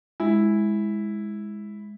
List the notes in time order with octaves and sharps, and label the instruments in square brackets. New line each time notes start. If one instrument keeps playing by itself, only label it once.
[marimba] G#3 [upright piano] E4